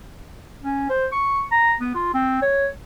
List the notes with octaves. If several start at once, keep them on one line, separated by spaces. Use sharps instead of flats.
C#4
C5
C#6
A#5
B3
F4
C4
C#5